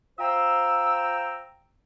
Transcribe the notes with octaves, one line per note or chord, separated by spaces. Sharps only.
F4 C5 G5 A#5 E6